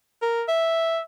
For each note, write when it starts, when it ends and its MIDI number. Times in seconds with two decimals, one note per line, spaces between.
0.22 0.43 70
0.48 1.00 76